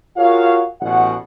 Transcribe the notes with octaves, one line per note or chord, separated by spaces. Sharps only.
F4 F#4 G#4 A#4 C#5 F5
A1 B2 C#4 F#5